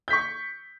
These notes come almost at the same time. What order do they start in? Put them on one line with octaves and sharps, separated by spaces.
G6 B6 C#6